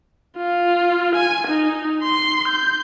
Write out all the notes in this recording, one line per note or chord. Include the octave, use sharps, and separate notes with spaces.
F4
G#5
D#4
C6
G6